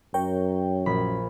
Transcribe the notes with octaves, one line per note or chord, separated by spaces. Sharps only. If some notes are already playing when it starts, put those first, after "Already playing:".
F#2 A#4 C#5 G5
A#1 B5